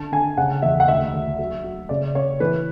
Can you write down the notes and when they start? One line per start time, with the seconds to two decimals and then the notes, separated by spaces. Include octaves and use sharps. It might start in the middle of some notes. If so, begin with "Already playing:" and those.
Already playing: D3 A5
0.12 D3 G#5
0.37 C#3 F#5
0.62 E2 E5
0.80 F#5
0.88 D2 E5
1.14 D2
1.39 F#3
1.64 F#3
1.89 C#3 D5
2.15 C#3 C#5
2.40 E3 B4